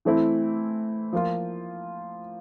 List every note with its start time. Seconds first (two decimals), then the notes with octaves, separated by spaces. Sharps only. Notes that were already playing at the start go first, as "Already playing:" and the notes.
0.05 E3 A3 C4 E4
1.13 F3 A#3 F4